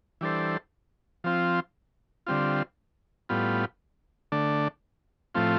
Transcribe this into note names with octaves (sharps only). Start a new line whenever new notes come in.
E3 G3 D4 A4 C5
F3 C4 F4
D3 G3 C4 F4
A2 G3 B3 F4
D3 A3 D4
A2 F3 A3 C4 F4